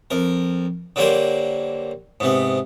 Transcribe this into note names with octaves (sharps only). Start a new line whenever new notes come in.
F2 A#4
D3 F#3 G3 A#3 C5
G#2 C3 B3